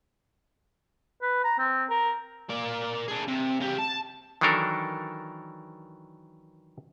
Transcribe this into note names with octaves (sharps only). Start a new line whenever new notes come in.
B4
A#5
C4
A#4
A#3 D5
D4 G#4
C3
C#3 G4
A5
D#3 E3 F#3 D4 A4 A#4